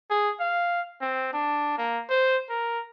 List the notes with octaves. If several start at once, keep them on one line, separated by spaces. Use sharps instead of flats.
G#4
F5
C4
D4
A#3
C5
A#4